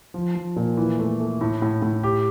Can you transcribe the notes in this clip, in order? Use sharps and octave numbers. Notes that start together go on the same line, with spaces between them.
F3
F3
A#2
E3
A3
A3
A2
A2
A2
G4